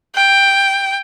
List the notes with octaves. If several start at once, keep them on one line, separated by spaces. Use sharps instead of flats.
G5